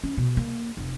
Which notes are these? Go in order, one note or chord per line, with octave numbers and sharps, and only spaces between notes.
C#4
B2
A#3
F1